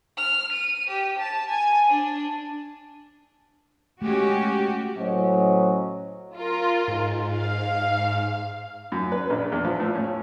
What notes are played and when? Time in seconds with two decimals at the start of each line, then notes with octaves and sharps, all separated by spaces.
0.18 F6
0.52 D#7
0.88 G4
1.19 A5
1.49 G#5
1.91 D4
4.02 G#3 A3 C#4 F#4 G4
4.97 A2 F#3 C#4 C5 D#5
6.36 F4 A#4
6.88 G#2
7.32 F5
8.92 F#2
9.12 B4
9.30 A#1
9.52 E2
9.65 F3
9.80 A2
9.95 C#4